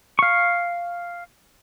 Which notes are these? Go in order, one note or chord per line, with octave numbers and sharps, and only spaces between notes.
F5 C#6